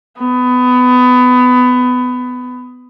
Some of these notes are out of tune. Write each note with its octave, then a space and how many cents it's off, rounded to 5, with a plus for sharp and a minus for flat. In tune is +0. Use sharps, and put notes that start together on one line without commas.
B3 +20